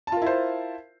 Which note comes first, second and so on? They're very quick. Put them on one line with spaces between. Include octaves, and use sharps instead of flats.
A5 F4 A#4 E4 C5